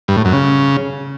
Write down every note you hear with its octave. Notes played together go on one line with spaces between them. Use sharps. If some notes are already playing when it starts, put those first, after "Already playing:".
G2
A2
F#2
C#3